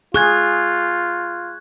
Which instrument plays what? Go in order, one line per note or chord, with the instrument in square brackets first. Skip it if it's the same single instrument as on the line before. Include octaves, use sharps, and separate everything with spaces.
[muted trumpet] F4 [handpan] G#4 [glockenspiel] C#6 F#6 G#6